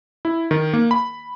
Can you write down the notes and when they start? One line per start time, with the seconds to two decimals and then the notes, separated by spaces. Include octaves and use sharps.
0.25 E4
0.51 D#3
0.73 A#3
0.91 B5